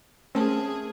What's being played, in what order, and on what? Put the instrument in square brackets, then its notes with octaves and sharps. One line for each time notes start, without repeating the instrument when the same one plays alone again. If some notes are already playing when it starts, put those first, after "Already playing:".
[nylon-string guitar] A3 A#4 A5 [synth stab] C4 C#4 [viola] G#4